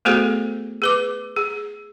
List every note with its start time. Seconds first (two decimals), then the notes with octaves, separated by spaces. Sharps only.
0.05 A3 B3 F#4 G#4 A4 C5
0.82 G#4 B4 D6
1.36 G#4